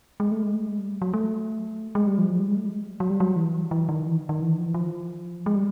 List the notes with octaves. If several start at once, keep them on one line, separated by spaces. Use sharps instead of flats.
G#3
A3
G#3
A3
G#3
G3
F#3
A3
G#3
G3
F3
F#3
G3
G#3
A3
G#3
F#3
G3
F#3
E3
E3
D#3
E3
D#3
E3
F3
E3
F3
G#3
G3